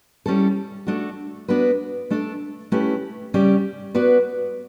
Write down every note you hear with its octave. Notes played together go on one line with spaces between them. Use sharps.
G3 C#4 E4 A4
A3 D4 F#4
B3 D4 F#4 B4
A3 D4 A4 D5
A3 C#4 E4 G4 B4
C#3 G3 C#4 G4 D5
B3 F#4 B4 D5